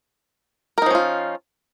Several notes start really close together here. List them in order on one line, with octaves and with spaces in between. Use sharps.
A#4 D#4 F3 C#4 F4